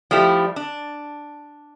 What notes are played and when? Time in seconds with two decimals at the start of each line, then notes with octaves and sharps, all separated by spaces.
0.11 F3 G3 A3 E4 G4
0.56 D4